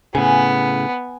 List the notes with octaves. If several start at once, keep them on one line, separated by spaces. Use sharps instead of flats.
A2 C#3 B3 G#5